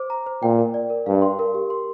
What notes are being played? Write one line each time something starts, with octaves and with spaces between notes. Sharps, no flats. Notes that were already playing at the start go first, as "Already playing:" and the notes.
Already playing: C5 D6
A#5
C5
A#2 G5
A#4
D5
A#4
G2 F5
C6
A#4
G4
C6